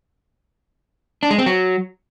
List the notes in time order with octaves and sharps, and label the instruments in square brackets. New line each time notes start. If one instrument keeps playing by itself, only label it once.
[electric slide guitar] D4
G#3
C4
F#3